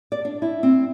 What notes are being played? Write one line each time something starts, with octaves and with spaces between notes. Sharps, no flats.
D5
D4
E4
C4